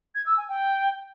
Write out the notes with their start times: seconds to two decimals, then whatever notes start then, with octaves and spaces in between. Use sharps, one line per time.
0.15 G#6
0.26 E6
0.37 G#5
0.49 G5